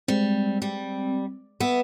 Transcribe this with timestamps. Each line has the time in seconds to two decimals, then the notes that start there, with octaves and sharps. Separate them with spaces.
0.08 G3 G#3 C4
0.62 G3
1.60 B3 E5